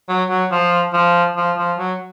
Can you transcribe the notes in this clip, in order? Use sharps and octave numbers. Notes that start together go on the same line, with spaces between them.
F#3
F#3
F3
F3
F3
F3
F#3